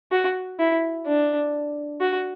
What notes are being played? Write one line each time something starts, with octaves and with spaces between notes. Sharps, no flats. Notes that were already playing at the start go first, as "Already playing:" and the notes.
F#4
E4
D4
F#4